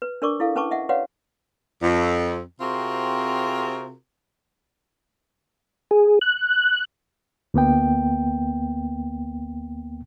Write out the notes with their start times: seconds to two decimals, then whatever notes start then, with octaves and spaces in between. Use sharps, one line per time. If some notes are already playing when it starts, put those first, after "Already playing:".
0.02 B4
0.22 D4 A#4 D5 C#6 D6
0.40 E4 A4 F5
0.56 C#4 B4 A5 C#6 D6
0.71 D#5 E5 F#5
0.89 F#4 B4 C#5 D5 F5 F#5
1.83 F2
2.61 C3 C4 F4 F#4 G#4 A#4
5.91 G#4
6.21 F#6
7.54 D2 A#3 B3 G5